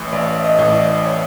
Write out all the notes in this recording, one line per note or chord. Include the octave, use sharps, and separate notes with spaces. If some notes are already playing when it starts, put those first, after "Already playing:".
Already playing: A1 A2 E3 C#5
A1 D5
D#5
A2 E3
D5
C#5